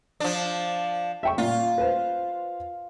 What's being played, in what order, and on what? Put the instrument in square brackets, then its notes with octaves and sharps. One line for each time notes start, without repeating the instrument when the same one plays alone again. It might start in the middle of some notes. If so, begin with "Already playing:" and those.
[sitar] F3 D4
[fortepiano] E5 G5 C#6
[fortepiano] A#2 [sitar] F4
[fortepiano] B4 C5